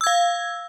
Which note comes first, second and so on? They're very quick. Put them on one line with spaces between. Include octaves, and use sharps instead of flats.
E6 G#6 F5